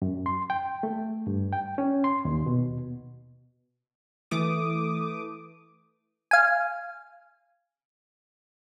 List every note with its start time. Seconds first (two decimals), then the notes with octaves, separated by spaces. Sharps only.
0.02 F#2
0.26 C6
0.50 G5
0.83 A3
1.27 G2
1.53 G5
1.78 C#4
2.04 C6
2.25 D#2
2.46 B2
4.31 E3 A3 D6 D#6
6.31 F5 G#5